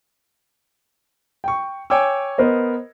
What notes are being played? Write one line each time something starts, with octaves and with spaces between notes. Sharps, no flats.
G5 C#6
C#5 G5 G#5 D6 E6
B3 A#4 C5 D#5